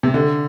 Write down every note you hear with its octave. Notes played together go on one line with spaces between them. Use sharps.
C3
D3